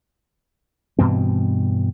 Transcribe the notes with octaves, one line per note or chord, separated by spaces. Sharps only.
G2 B2 E3 C4